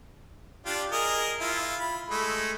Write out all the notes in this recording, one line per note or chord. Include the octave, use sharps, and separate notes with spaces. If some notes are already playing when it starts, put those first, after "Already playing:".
D4 F4 G4
G#4 A#4 D#5
E4 F4
B5
G#3 A3